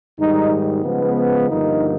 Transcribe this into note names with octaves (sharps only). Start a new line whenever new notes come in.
G#2 D#3 G3 D#4
C#3 F3 G#3 B3
G2 D3 F3 A#3 D#4